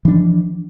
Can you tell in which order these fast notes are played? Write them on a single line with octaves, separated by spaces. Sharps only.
E3 D4 F3